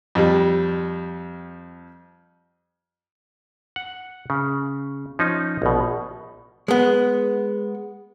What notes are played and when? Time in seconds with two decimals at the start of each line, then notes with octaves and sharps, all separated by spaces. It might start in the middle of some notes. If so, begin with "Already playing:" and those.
0.15 F2 G3
3.76 F#5
4.30 C#3
5.19 F3 C#4 D#4
5.62 A#1 B2
6.68 G#3 B3